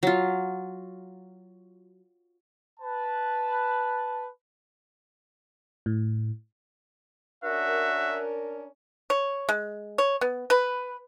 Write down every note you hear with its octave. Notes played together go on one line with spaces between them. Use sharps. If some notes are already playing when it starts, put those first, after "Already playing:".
F#3 F4
B4 A5
A2
C#4 D4 F#4 A#4 E5
C#5
G#3
C#5
B3
B4